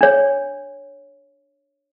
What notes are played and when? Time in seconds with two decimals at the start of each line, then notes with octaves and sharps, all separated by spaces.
0.01 D4 C#5